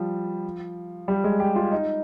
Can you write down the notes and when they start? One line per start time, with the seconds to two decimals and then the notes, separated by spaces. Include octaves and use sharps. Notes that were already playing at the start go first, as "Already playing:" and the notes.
Already playing: F3 G3
1.08 G3
1.24 G#3
1.40 G4
1.56 F4
1.72 D#4